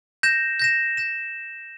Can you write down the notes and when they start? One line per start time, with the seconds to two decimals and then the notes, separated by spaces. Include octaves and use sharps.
0.23 G6 A#6 E7
0.59 G6 A#6 E7
0.97 G6 A#6 E7